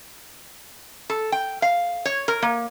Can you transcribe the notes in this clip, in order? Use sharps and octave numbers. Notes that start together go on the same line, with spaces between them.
A4
G5
F5
C#5
A#4
A#3